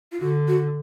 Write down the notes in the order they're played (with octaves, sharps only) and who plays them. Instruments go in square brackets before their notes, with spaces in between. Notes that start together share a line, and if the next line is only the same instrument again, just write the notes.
[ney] F4
[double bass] D3 [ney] F#4
[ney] F#4